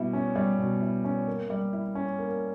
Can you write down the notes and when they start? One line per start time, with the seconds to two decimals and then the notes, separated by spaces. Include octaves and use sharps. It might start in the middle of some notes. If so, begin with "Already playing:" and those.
Already playing: B2 G3 E4
0.13 C#4
0.36 G3
0.59 B2
0.81 E4
1.05 C#4
1.27 A#3
1.50 G3
1.73 E4
1.95 C#4
2.18 A#3